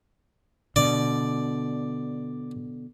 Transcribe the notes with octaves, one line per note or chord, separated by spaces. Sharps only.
B2 D3 D5